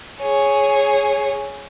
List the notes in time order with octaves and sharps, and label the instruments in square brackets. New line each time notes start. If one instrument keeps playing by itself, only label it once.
[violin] G#4 C#5